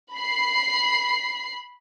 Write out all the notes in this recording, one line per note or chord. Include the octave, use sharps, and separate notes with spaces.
B5 C7